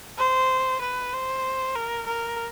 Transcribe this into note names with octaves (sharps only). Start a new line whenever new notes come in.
C5
B4
C5
A#4
A#4